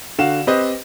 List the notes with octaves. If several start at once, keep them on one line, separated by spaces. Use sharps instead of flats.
D3 F#4 F5 E7
C4 G4 B4 C5 D#5